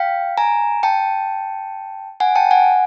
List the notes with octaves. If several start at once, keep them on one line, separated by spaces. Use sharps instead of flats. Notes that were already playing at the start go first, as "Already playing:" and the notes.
Already playing: F5 G5
G#5 A#5
G5 A5
F#5 G#5
G5 A5
F#5 G#5